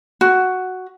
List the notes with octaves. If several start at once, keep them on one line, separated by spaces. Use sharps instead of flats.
F#4